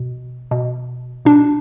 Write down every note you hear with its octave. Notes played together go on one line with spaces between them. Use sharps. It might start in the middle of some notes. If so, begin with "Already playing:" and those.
Already playing: B2
B2
B2 D4